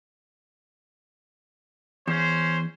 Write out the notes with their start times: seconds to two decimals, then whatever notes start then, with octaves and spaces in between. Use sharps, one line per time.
2.08 E2 C#4 C5